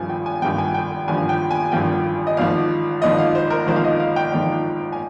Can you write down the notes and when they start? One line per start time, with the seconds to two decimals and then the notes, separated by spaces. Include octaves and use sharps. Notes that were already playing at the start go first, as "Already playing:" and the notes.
Already playing: G#1 G2 F3 G#5
0.09 G5
0.26 G#5
0.42 G#1 G2 F3 G5
0.58 G#5
0.74 G5
1.07 G#1 G2 F3 G#5
1.29 G5
1.51 G#5
1.72 G#1 G2 F3 G5
2.27 D#5
2.37 G#1 G#2 F3 F5
3.02 G#1 G#2 F3 D#5
3.18 F5
3.35 C5
3.50 A#4
3.67 G#1 G#2 F3 C5
3.76 F5
3.84 D#5
4.00 F5
4.16 G5
4.32 G#1 G#2 F3
4.93 G#5